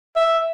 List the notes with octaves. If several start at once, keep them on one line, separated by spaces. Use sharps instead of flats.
E5